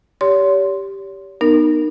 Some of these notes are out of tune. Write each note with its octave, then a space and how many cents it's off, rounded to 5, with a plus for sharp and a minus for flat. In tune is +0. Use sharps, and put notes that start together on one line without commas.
G4 +0 C#5 +40 C6 +0
B3 +0 D#4 -25 A#4 +0